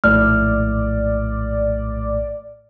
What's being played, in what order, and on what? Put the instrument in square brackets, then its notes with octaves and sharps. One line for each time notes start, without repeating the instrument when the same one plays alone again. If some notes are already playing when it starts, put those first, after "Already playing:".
[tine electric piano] A#1 A2 A3 [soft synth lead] D5 [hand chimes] F6